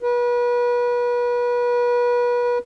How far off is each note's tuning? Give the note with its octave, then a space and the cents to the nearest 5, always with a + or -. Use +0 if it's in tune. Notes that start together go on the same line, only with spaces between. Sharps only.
B4 -30